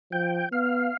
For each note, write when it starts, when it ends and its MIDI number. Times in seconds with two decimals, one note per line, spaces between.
0.12 0.44 53
0.12 0.49 79
0.52 0.90 59
0.52 0.97 77